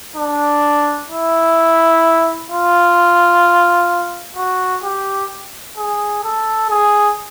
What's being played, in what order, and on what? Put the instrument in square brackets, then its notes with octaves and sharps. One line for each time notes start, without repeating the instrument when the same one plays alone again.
[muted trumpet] D4
E4
F4
F#4
G4
G#4
A4
G#4